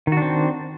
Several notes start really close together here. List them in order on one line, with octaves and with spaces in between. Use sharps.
D#3 F#4 D4 C4